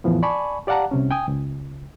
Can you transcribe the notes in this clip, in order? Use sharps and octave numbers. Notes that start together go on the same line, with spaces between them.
E2 A2 E3 F3 B3
D5 G#5 A5 B5 C#6
G4 D5 F5 F#5 A5 A#5
C2 C3 C#4
G5 G#5 D#6
C#2